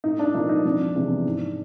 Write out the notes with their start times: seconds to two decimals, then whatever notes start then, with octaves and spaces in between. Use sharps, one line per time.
0.04 A2 D#4
0.19 D4
0.34 F3 A#3 D#4
0.49 D#4
0.65 F2 D4
0.95 C3 E3 G#3 B3
1.26 G#2